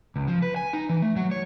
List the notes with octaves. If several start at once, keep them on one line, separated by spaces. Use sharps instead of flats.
C#2
F3
B4
G#5
D#4
E3
A3
F#3
C#5